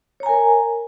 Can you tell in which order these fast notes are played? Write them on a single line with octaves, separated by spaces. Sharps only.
C#5 A#5 G#5 A#4